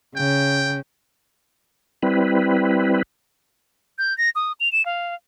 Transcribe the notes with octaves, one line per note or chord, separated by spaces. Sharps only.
C#3 G5
G3 C4 E4 B4
G6
A#6
D#6
F7
E7
F5